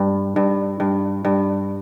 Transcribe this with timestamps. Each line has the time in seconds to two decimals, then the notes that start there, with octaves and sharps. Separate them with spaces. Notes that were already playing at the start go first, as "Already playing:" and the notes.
Already playing: G2
0.36 G2
0.80 G2
1.25 G2